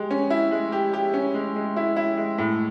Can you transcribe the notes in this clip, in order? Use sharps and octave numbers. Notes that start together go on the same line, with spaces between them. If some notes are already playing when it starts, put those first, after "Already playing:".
Already playing: G#3 G4
C#4
E4
G#3
G4
G4
C#4
G#3
G#3
E4
E4
G#3
A2